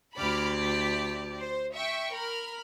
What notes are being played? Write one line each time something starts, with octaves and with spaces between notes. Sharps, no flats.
D2 G4 D5 B5 D6 F6
B6
C5
E5 G5 C#6
A#4 B5 F6